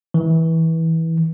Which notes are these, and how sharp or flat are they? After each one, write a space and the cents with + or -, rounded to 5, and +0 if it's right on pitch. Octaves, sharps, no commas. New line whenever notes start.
E3 -20